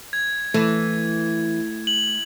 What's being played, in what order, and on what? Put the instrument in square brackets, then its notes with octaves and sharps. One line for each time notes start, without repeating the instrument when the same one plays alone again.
[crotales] G#6
[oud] E3 [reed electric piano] A3
[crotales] F#7